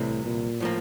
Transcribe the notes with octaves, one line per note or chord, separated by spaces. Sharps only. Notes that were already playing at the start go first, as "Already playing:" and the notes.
Already playing: C2 A2 C3 E3
A#2
A2 F3 A#3